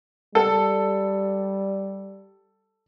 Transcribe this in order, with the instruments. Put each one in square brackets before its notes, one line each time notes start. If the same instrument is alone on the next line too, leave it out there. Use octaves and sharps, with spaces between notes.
[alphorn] G3 [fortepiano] A4